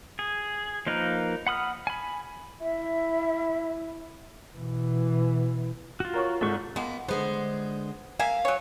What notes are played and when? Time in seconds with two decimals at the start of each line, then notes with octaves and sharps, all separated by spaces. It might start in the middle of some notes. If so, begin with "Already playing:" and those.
0.19 G#4
0.87 F3 A#3 D#4 A#4 B4
1.47 F#5 B5 D#6 F6
1.87 G#5 B5
2.61 E4 E5
4.56 B2 E3
6.00 F4 F#4
6.14 A#4 C#5 C#6
6.41 C2 F2 G#2 A4 C#6
6.76 G#3 A#3 B3
7.08 D3 G#3 B3 C5
8.19 A#3 E5 F5 G#5
8.45 F#3 C#5